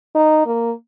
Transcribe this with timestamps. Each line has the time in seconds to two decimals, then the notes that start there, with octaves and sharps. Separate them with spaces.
0.15 D#4
0.46 A#3